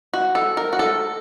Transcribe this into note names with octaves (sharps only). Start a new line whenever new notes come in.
F#4
A4
A#4
F#4
A4